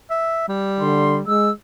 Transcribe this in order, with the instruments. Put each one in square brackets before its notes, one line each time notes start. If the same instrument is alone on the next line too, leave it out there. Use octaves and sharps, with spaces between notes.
[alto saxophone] E5
G3
[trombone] D3 [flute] C6
[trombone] G#3 [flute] E6